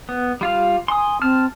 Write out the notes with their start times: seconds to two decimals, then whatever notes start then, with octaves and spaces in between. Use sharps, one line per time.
0.09 B3
0.41 G3 F4 F5
0.88 G#5 C6 D#6
1.22 C4 A5 F6